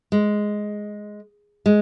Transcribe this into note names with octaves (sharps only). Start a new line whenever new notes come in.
G#3
G#3